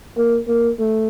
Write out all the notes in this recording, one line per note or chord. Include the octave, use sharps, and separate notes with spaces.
A#3
A#3
A3